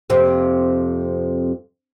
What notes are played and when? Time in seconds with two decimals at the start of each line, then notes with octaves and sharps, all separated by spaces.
0.10 F2 C3 A#3